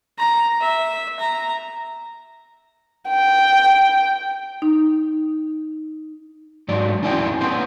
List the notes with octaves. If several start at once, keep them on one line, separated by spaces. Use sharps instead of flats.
A#5
E5
A#5
G5
D#4
G#2 F#3 D5
E2 C#4 D4 E4 C5 G5
B3 C#4 D4 C5 D5